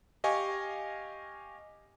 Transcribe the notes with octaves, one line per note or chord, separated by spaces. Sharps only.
G4 D#5 F5 G#5 C#6